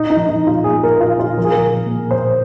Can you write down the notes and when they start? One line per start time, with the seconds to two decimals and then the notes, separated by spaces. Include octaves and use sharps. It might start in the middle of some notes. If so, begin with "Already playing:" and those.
Already playing: A#2 D#4
0.10 D#4
0.16 F3
0.29 D#4
0.41 A#2
0.47 F4
0.64 A#3 G#4
0.83 A#4
0.89 A#2
1.01 F4
1.13 A#2
1.19 F4
1.38 F3 A#4
1.45 G#4
1.52 A#4
1.62 A#2
1.86 A#3
2.11 A#2 C5